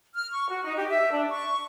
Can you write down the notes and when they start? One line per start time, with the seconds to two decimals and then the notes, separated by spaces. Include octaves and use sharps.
0.14 F6
0.31 C#6
0.49 F#4
0.64 D#4
0.76 G4
0.89 E5
1.12 D4
1.29 C#6